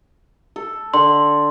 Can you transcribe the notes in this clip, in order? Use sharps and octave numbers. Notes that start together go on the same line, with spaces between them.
A4
D3 C6